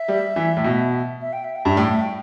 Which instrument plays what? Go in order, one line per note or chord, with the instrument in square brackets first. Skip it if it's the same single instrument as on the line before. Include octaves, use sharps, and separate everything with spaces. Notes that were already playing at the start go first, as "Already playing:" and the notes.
Already playing: [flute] E5
[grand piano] G3
E3
A2
B2
[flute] E5
G5
E5
G5
[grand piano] G2 [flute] E5
[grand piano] A2 [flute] G5
[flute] E5
G5